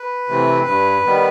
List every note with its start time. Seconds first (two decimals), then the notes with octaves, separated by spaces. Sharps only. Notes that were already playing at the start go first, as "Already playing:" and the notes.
Already playing: B4
0.29 C3 E3 A3 C4
0.67 G2
1.06 D#3 G3 B3